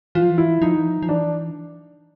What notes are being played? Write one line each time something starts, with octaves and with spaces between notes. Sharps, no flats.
E3 F4
F3
E3
E4
F3 D#4
E3
F3
F3
E3 D4